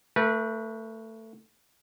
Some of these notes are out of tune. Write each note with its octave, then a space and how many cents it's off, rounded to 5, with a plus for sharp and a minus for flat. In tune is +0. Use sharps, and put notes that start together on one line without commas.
A3 +20 B4 -25